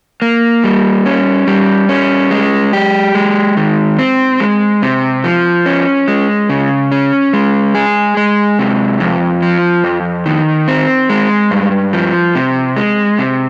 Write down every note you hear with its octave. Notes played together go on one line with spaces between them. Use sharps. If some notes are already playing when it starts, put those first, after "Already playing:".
A#3
G3
C#4
G3
C#4
G#3
G4
G#3
D#3
C4
G#3
C3
F3
C#4
G#3
C#3
C#4
G#3
G#4
G#3
C3
F2
F3
F2
D#3
C4
G#3
G2
F3
C3
G#3
C3